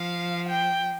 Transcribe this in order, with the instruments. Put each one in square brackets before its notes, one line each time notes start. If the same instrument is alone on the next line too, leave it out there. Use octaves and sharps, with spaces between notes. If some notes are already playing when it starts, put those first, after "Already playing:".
Already playing: [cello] F3 [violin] F5
[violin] G5